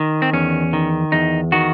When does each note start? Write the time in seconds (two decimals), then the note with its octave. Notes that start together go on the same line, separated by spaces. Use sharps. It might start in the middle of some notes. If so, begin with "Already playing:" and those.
Already playing: D#3
0.22 C4
0.33 E2 C#4
0.73 D#3
1.12 E2 D#4
1.52 D#3 F#4